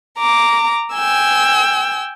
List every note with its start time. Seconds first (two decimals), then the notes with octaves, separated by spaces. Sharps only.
0.20 A#5 D6
0.94 G5 G#5 E6